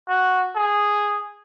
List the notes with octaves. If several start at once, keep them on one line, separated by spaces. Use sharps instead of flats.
F#4
G#4